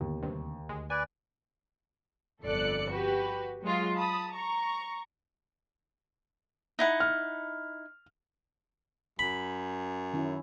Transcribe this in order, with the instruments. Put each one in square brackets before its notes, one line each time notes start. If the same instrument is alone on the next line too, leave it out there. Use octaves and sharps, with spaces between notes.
[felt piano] D#2 [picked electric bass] D3 B3
[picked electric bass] D2 [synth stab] G2 C3
[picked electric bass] D2 [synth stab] G#3
[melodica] B4 D5 [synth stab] G#5
[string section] G1 F2 A4 D5 F#6 C#7
F#4 G4 B4
F#3 G#3 F4
A5 B5 D#6
A#5 C#6
[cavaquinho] D#4 E4 F#5
[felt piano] F6
[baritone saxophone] F#2 [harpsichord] B5
[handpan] D#3 C#4 E4